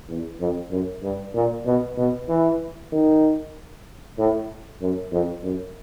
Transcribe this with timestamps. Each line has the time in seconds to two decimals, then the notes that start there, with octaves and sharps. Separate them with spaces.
0.09 E2
0.40 F2
0.71 F#2
1.03 G2
1.34 A#2
1.66 B2
1.98 B2
2.29 E3
2.92 D#3
4.18 A2
4.81 F#2
5.12 F2
5.43 F#2